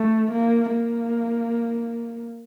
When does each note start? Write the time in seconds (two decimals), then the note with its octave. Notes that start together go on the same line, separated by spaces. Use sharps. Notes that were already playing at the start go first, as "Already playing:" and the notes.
Already playing: A3
0.31 A#3
0.73 A#3